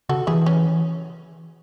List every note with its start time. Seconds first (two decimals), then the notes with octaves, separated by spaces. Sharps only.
0.09 C#3 F#4 A4
0.27 E3 E4 G#4
0.46 C#4